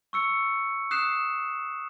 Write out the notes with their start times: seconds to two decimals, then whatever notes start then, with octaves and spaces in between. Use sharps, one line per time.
0.13 C#6 E6 C#7
0.91 D#6 F#6 C7 E7